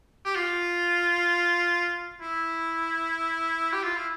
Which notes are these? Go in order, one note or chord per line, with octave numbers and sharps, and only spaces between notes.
G4
F4
E4
G4
F4
E4